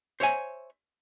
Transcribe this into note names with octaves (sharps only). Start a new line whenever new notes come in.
C5 C#5 E5 G#5